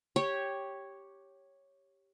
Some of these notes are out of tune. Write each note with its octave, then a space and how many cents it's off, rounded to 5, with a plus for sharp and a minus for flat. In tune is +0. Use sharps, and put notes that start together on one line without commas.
G4 +0 C#5 -5